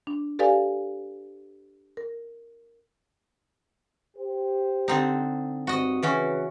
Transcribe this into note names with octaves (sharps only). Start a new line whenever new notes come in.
D4
G4 A4 B4 D5 F5 G#5
A#4
G4 C5
D3 C4 D#4
G2 C4 F#4 D#5
C#3 E3 C#4 F#4 B4